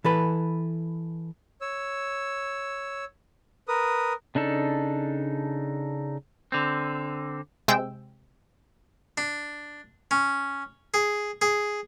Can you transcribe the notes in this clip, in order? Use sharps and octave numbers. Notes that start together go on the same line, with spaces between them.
E3 A4 B4
C#5 E6
A#4 B4 D#6
C#3 D4 D#4 A4
D3 C4
C3 G#3 C4 G5 E6
D4
C#4
G#4
G#4